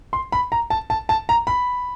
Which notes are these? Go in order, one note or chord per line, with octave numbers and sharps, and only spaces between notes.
C6
B5
A#5
A5
A5
A5
A#5
B5